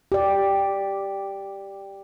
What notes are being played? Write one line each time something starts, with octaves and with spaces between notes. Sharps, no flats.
G4 D5